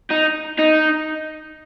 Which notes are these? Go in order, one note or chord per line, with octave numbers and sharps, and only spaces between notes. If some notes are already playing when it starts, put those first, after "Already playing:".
D#4
D#4